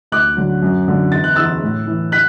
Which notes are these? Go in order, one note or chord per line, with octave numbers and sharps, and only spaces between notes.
D2 D6 F#6
D3 F#3
F#2
D3 F#3
E2 A6
F#6
E3 E6 A6
A2
E3
F#6 B6